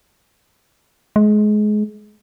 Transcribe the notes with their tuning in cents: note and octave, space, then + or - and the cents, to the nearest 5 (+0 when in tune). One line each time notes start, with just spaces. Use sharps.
G#3 +25